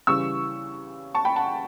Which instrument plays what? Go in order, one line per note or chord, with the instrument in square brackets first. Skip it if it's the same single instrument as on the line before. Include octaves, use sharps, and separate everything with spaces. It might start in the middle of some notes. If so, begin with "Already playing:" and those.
[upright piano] C#3 E3 G3 C#6 E6
A5 C#6
G5 B5
F#5 A5